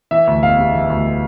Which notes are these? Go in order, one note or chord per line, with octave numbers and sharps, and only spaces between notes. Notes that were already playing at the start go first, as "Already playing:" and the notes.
E3 E5
D2
E1 F5
C3
E3
D2